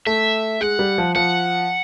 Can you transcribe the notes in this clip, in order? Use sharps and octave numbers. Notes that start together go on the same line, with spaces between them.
A3 E5
G#3 F#5
G3
F3
F3 F#5